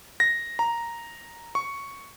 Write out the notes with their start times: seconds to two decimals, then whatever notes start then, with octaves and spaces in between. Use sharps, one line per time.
0.20 A#6
0.59 A#5
1.55 C#6